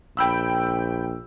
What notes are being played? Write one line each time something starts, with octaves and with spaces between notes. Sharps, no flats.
A#1 G5 B5 E6